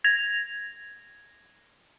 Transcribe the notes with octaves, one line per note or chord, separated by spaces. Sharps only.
G#6 A#6 F7